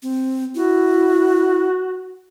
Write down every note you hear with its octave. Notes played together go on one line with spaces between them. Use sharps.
C4
E4 F#4